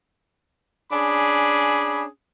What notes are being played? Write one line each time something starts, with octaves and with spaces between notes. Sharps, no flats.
C#4 D4 G#4 B5